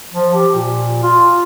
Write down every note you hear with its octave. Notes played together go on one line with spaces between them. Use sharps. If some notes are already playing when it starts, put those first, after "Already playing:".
F3
G4
A#2
F4